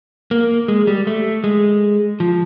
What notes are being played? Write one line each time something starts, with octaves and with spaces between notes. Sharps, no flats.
A#3
G#3
G3
A3
G#3
F3